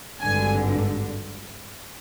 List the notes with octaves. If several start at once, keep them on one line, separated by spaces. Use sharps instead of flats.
G#1 G2 D3 G#5